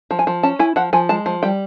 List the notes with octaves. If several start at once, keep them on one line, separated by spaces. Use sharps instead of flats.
F3
G#5
F3
C#4 A5
E4 G#5
F3 F#5
F3 G#5
G#3 A5
F3
G3 G5